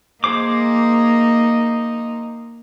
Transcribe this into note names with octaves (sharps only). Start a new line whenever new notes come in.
A#3 D#4 G#4 C5 D6